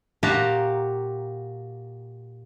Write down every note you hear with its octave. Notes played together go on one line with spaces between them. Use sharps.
A#2 F#4 G4 A5 A#5